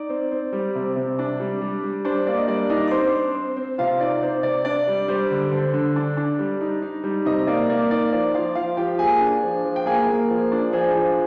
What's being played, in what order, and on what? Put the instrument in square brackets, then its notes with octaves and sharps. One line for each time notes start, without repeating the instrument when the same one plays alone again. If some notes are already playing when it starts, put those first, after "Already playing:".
Already playing: [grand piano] D#4 D5
C4
C4
G3
C3
C3
D4
G3
G3
G3
D4 C5
A#3 D5
D#5
G3 D5
D4 D#4 D#5
D6
C4 C5 C6
C4
C4
C4
C3 F4 F5
D#4 D5
C4 C5
C3 D5
D4 D5
G3
G3 C5
D3
D3 C5
D3
D4
D4
G3
D#4
D#4
G3
C3 D#4 D#5
A#3 D5
A#3 D5
D#4 D5
F3 D5
F3 F4 F5
F3 F4 F5
F3 G4 G5
A#3 G#4 G#5
D4
F3
F3
G5
A#3 G#4 G#5
A#3
F3
D4
F3 G#4 G#5
F3